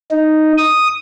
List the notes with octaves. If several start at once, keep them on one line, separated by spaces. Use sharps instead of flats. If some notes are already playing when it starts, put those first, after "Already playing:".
D#4
D#6